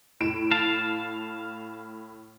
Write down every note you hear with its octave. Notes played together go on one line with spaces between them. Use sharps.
A2 D7 E7
F5 A5